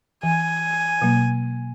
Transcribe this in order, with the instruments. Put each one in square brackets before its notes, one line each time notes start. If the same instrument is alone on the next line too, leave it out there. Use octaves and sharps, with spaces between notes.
[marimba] E3 [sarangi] G#5
[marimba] B2 F#3 A#3